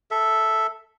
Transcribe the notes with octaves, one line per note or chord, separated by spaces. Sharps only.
A4 E5